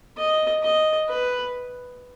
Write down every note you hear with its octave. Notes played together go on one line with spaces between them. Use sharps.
D#5
D#5
B4